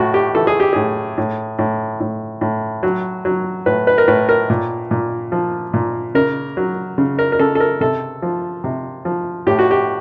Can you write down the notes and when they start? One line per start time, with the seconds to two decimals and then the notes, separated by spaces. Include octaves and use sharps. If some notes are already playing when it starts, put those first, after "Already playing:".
Already playing: A2 F#4
0.14 G4
0.35 E3 A4
0.47 G#4
0.60 G4
0.73 A2 G#4
1.18 A2
1.59 A2
2.00 A2
2.41 A2
2.83 F#3
3.25 F#3
3.66 A2 B4
3.87 B4
3.98 A#4
4.08 A2 B4
4.29 A#4
4.50 A#2
4.91 A#2
5.32 F3
5.74 A#2
6.15 C#3 A#4
6.57 F#3
6.98 C#3
7.19 A#4
7.32 A#4
7.39 C#3 A4
7.55 A4
7.60 A#4
7.81 C3 A4
8.22 F3
8.64 C3
9.05 F3
9.47 A2 G4
9.59 F#4
9.71 G4